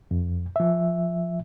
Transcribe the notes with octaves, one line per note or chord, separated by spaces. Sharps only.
F2
F3 E5